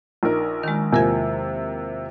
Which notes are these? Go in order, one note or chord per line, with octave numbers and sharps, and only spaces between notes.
A#1 D#4 A#4
D#3 G#3
E2 C3 F3 A#3 A#4 G#6